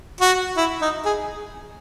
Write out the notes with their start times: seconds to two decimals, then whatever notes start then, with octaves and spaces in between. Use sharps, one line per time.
0.21 F#4
0.57 E4
0.81 D#4
1.05 G#4